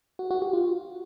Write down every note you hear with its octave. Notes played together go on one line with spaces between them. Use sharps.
F#4
F#4
G4
F4